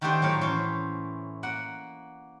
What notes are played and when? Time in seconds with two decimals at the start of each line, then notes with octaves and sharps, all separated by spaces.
0.01 D3 D#3 A3 D4 G4 C5
0.22 A2 F#3 E4 A4 A#4 F5
0.41 E3 C#4 C5
1.43 A#3 F#5